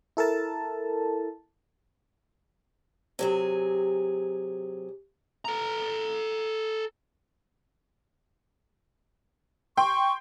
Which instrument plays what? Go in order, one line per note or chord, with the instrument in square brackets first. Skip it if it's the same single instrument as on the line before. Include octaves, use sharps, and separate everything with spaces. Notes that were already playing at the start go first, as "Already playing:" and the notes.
[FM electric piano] E4 A4 A#4 A5
[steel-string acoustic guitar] C3 F#3 G#4
[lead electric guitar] A4 A#5
[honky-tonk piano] G5 C6 [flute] C#6